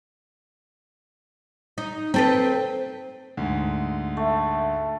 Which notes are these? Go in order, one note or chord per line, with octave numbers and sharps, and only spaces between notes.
D#4
C4 A4 B4
D2 G#2
A3